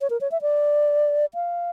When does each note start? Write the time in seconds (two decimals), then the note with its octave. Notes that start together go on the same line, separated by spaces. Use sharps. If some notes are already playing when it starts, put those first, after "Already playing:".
0.01 C#5
0.10 A#4
0.21 C#5
0.32 E5
0.42 D5
1.35 F5